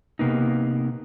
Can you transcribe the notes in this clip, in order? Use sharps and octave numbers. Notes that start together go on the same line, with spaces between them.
C3 A#3 B3 D#4